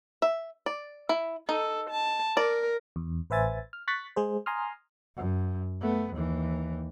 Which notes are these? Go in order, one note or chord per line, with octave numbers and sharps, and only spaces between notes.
E5
D5
E4
D#4 A4
A5
A#4 D5
E2
A1 B4 C5 E5 G#5 A6
F6
C#6 F#6 A6 B6
G#3 G#4 C5
G#5 A#5 C6 D#6 F6
F#2
A3 B3
D#2 E3